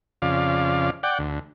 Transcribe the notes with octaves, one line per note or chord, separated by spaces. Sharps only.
F2 C#3 D5 F5
D5 F#5 G5
D2